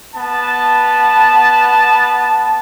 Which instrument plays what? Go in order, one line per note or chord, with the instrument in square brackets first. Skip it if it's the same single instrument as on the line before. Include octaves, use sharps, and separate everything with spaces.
[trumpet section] B3 A5